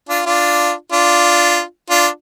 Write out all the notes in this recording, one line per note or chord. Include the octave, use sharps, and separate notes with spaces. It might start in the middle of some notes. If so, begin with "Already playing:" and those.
D4 F4
D4 F4
D4 F4
D4 F4